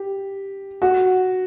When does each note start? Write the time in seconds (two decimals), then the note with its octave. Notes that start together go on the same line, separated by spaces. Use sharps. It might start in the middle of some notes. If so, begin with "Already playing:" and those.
Already playing: G4
0.82 F#4